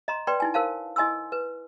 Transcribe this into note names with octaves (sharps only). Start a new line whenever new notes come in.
D#5 A#5 C6
B4 D5 G5 C6
D#4 E4 G#5
A#4 C5 F5 A5
E4 D#5 G#5 C6 E6
B4